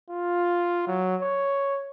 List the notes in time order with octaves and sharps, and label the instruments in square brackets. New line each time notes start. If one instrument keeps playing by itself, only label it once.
[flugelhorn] F4
F#3
C#5